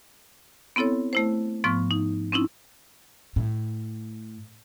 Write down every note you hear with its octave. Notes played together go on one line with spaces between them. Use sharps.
B3 C4 E4 A4 C#5
A3 E4 C5
G#2 F3 B3 C#6 F6
D#4
C4 C#4 D#4 E4
A2